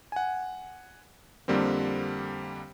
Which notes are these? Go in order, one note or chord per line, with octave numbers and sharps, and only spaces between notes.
F#5 G#5
F2 D3 G3 A#3 C4